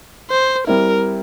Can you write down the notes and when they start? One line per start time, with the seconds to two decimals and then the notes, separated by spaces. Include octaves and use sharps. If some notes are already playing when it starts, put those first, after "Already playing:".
0.31 C5
0.67 G3 C4 E4 A#4